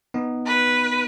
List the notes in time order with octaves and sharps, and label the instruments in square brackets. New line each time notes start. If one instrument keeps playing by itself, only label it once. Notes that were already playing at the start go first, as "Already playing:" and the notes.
[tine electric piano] B3 D#4
[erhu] B4